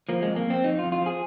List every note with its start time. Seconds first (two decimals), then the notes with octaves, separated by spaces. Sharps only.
0.09 F3 A#3
0.23 F2 G#3
0.36 A#3
0.46 F2 C4
0.64 F2 D#4
0.79 F4
0.84 F2
0.92 F4
1.01 F3 G#4